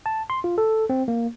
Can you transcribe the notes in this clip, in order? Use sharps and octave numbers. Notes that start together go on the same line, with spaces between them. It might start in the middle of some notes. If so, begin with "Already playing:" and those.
A5
C6
F4
A4
C4
A#3